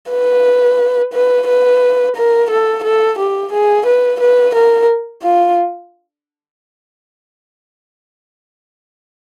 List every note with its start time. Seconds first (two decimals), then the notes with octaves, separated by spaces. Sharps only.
0.10 B4
1.13 B4
1.47 B4
2.16 A#4
2.50 A4
2.84 A4
3.18 G4
3.52 G#4
3.85 B4
4.20 B4
4.54 A#4
5.22 F4